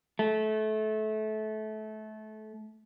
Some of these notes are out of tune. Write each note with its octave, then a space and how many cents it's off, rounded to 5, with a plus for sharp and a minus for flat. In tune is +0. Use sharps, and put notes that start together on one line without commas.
A3 -25